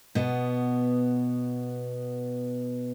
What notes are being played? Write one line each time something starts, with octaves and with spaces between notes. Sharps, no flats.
B2 B3